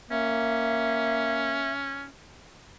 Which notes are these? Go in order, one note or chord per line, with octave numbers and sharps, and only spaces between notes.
A#3 C#4 E5